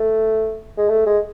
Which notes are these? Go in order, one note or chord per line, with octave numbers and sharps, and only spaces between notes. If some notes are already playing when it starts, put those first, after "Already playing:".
Already playing: A3
G#3
A3
G#3